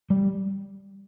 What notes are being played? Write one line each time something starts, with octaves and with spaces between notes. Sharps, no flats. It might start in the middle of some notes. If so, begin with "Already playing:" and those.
G3